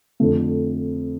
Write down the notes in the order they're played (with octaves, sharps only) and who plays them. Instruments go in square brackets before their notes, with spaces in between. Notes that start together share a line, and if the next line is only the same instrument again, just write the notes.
[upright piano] F2 D3 A3